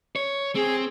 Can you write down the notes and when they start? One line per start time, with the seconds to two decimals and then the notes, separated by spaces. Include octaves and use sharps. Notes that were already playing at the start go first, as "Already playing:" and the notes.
0.16 C#5
0.55 C4 G#4